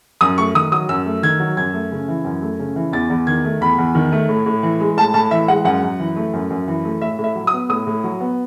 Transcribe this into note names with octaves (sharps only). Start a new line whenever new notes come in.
F#2 D#6
A3 C#6
D#3 D#6
F#3 D#6
F#2 E6
A3
D#3 G#6
F#3
F#2 G#6
A3
C#3
E3
F#2
A3
C#3
E3
E2 A6
E2
D#3 G#6
A3
E2 B5
E2
D#3
A3
A2
A2
E3
G#3
A2 A5
A2 A5
E3 E5
G#3 F#5
F#2 F#5
F#2
E3
A3
F#2
F#2
E3
A3
A2 E5
A2
E5
F#3
D#6
B3
A2 D#6
A2
F#3
B3